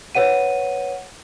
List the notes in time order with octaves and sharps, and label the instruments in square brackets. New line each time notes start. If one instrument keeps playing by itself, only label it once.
[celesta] B4 C#5 F#5 D#7